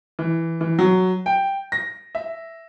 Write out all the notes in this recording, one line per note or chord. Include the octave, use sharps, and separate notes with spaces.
E3
E3
F#3
G5
A#6
E5